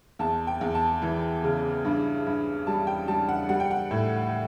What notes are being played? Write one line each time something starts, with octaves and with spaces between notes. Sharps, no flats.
E2 A5
G5
E2
A5
E3
C#3
G2
G2
G3 A5
G5
G3 A5
F#5
G3 F#5
G5
F#5
A2